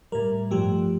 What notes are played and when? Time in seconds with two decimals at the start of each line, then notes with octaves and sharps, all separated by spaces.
0.12 A2 G3 A#4
0.51 G2 F3 A3 G4